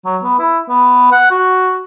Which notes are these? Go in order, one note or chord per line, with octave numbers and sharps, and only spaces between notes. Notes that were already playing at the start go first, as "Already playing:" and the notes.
F#3
B3
E4
B3
F#5
F#4